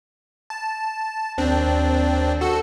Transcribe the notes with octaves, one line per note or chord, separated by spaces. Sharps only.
A5
D#2 C4 D4
F#4 A4